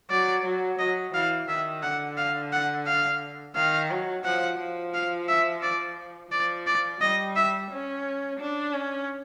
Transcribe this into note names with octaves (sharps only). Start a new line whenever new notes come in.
F#3 D5
F#3
F#3 D#5
E3 F5
D#3 E5
D3 F#5
F5
F#5
F5
D#3 F5
F#3
F3 F#5
F3
F5
E5
D5
F3 D5
D5
G3 D#5
E5
C#4
D4
C#4